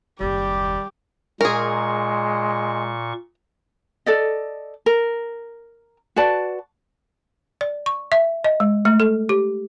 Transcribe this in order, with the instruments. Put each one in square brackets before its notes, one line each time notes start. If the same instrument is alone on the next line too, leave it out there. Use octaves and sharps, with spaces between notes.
[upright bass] F#1 D#2 [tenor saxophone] G3 [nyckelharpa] G4
[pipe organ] A#2 C#6 [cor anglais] G#3 [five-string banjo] G#4 A#4
[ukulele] A4 D5 D#5
A#4
F#4 B4 D5 A5
[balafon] D5
C#6
E5
D#5
G#3
A3
A4
G4